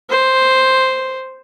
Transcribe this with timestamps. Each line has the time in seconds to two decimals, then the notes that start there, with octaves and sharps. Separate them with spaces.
0.10 C5